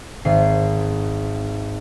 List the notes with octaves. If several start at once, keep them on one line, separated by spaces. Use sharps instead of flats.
G#1 C7